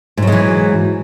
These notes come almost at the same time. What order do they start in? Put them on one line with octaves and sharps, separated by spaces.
G#2 F#3 G#3 E3